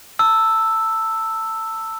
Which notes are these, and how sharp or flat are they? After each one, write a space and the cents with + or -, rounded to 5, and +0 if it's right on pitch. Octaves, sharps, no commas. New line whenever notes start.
A5 +30 E6 +0